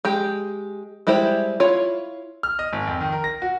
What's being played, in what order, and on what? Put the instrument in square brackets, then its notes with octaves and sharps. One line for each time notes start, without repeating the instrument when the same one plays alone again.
[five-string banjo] G#3 G4
G3 G#3 E4 G4 C5
E4 F4 C#5
[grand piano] F6
D#5
G#1
F2
D#3
A#4
A#6
F#4